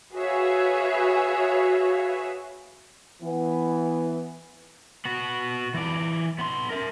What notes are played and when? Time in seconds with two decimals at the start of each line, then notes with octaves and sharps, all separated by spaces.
0.15 F#4 G#4 B4 C#5 E5 F5
3.22 E3 B3
5.05 B3 F#4
5.74 E3 D5
6.39 B3 C6
6.71 A#4 E5